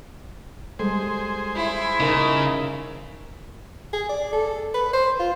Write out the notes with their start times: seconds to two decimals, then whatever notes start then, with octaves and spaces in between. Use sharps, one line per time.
0.79 G3 G#3 G#4 A4 C5
1.56 E4
2.00 C#3 D#4 A#4 D#5
3.93 G#4
4.09 D5
4.33 A4
4.74 B4
4.93 C5
5.20 F4